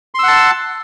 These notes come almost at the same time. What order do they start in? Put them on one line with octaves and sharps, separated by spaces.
C6 E6 F#5 A5